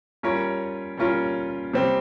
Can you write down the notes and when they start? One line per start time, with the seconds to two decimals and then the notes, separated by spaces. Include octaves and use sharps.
0.23 G3 C#4 F4 A#4 C#5
0.97 G3 C#4 F4 A#4 C#5
1.73 C3 G3 C4